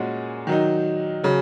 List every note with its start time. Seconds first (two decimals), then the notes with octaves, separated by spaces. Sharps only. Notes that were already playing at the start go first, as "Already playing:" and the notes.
Already playing: A#2 G#3 C#4 F#4
0.47 D#3 F#3 D#4
1.23 C#3 F#3